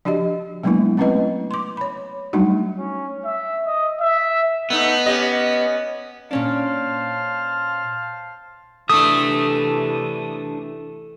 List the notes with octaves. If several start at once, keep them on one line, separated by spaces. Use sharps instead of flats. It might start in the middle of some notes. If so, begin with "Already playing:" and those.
F3 D4 F#4 G4 D#5
F#3 G#3 A#3 B3 D4 E4
A3 C4 C#4 E4 B4 D#5
C6 D6
C#5 B5
F#3 G3 A3 D4 D#4 F#4
C#4
E5
D#5
E5
A3 B3 D#4
C#4 G4 D#5
A#2 C#4 D4 C5 F5 A5
C3 E3 A3 D4 E5 D#6